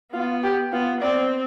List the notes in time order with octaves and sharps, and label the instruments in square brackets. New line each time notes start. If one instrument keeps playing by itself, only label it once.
[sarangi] B3 [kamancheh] F4
[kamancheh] G4
[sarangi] B3 [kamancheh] F4
[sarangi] C4 [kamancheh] D5